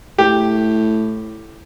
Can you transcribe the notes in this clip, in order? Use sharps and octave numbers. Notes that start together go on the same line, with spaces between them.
A2 G4